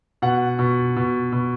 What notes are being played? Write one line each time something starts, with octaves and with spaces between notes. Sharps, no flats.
B2 F#5
B2
B2
B2